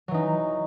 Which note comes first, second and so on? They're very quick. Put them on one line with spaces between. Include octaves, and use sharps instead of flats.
F#3 E3 D#4